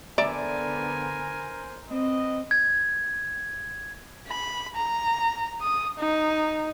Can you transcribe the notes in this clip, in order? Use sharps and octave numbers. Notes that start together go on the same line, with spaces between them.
D3 B3 A#4 C5 D5 E5 G#5 A#5
C4 B4 D#5
G#6
B5
A#5
D#6
D#4